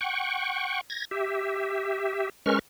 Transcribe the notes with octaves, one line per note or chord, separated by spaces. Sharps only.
F#5 G5 C#6
G#6 A#6
G4 E5
G#3 C#4 A#4 B4 C#6 F6